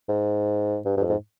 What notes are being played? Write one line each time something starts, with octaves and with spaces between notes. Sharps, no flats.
G#2
G2
G2
F2
G#2